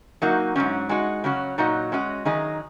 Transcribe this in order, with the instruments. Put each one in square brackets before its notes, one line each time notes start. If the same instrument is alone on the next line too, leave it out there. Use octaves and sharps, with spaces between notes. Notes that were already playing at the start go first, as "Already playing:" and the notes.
[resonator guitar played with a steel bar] F#3 A#3 D#4 F#4
G#2 D#3 F#3 C#4
G#3 D#4 F#4 D#5
C#3 F#3 C#4 F#4
A#2 F#3 D#4 F#4 D#5
G#3 C#4 F#4 D#5
D#3 F#3 D#4 G#4 D#5